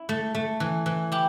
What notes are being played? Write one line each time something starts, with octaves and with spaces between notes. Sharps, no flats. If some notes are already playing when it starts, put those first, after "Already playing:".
Already playing: E4
A3
A3
E3
E3
E4 G4